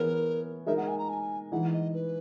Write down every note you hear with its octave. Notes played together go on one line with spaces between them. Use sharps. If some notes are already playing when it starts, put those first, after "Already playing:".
Already playing: E3 B3 E4 G#4 A#4 C#5
G#3 D#4 A#4 E5
F#5
G#5
A#5
G#5
E3 G#3 D#4 F#5
D#5
B4